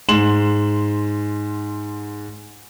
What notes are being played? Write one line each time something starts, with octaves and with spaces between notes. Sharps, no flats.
G#2 C6 E7 F#7